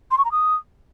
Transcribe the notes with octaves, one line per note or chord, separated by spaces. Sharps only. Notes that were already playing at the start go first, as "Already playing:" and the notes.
C6
C#6
A#5
D#6